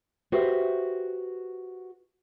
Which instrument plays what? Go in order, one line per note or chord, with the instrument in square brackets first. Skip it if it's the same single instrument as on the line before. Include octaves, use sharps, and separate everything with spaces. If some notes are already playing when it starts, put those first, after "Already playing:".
[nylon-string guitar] F#4 G4 B4 C5 D#5 E5